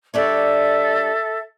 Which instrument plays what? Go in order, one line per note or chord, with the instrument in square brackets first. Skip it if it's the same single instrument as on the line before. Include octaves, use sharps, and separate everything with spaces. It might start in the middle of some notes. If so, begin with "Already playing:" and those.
[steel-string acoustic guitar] G3 D4 C#5 [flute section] A4 E5